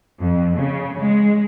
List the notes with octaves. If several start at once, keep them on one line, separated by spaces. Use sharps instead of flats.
F2
C#3
G#3